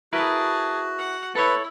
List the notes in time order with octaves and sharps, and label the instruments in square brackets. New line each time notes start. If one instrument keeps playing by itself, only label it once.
[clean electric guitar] E4 A#4 B4 [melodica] F#4 [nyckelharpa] G#4 A5
[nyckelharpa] F#5
[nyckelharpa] E4 [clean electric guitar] A4 C#5 [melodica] B4